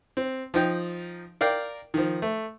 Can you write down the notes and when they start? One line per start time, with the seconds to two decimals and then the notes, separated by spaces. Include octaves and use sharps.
0.17 C4
0.54 F3 D#4 G5
1.41 A#4 D5 F5 G5
1.94 D#3 F3
2.22 A3